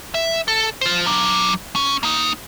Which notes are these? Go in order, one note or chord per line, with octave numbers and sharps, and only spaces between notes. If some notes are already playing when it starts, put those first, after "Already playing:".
E5
A4
F4 C5
F#3 D4
C#4
A#3 D#4